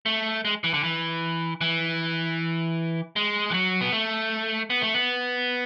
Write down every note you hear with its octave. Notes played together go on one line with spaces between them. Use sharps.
A3
G#3
E3
D3
E3
E3
G#3
E3
F#3
B3
A3
B3
A3
B3